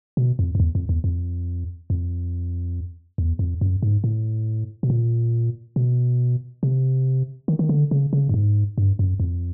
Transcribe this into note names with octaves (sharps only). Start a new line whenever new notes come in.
B2
F2
F2
E2
F2
E2
F2
F2
E2
F2
F#2
G#2
A2
B2
A#2
B2
C3
D#3
D#3
D3
C#3
C#3
G2
G#2
G2
F#2
F2